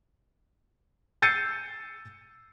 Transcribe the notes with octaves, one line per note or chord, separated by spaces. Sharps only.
E6 G6 A6 C7 C#7 D#7